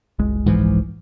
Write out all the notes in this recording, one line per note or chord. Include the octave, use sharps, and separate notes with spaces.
F#1 C2 G#3
G#2 E3 F3